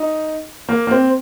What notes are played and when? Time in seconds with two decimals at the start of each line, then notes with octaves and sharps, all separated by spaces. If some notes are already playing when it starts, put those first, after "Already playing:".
Already playing: D#4
0.69 A#3
0.87 A#3
0.91 C4